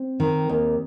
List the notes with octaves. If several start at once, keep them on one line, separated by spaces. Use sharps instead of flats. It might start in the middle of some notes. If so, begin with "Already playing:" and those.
Already playing: C4
D#3
D#2